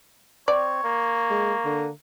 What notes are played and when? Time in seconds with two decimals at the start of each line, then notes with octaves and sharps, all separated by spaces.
0.48 C4 C#5 D5
0.84 A#3
1.30 G#3
1.65 D3